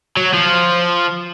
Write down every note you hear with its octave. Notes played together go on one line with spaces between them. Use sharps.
F#3
F3